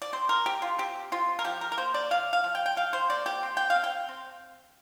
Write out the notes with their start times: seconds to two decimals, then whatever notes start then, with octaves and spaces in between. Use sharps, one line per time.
0.02 D5
0.13 C4 C5
0.29 A#4
0.46 C4 G4
0.62 F4
0.79 C4 G4
1.12 C4 F4
1.39 A#4
1.44 F3 G4
1.61 A#4
1.72 A#4
1.77 A#3 C5
1.94 D5
2.11 C3 F5
2.33 F5
2.44 F3
2.55 G5
2.66 G5
2.76 F3 F5
2.93 C5
3.09 A#3 D5
3.26 G4
3.43 C4
3.57 G5
3.70 F5
3.76 C4
3.84 G5
4.09 C4